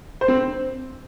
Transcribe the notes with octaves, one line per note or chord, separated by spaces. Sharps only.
C5
C4
C5